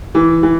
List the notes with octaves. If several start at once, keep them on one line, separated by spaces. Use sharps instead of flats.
E3
E3